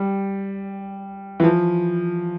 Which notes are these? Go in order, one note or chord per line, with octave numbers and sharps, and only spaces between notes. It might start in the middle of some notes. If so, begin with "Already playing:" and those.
Already playing: G3
E3
F3